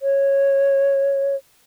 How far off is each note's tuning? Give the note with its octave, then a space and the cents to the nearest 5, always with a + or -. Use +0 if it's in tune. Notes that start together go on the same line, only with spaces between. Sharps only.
C#5 -10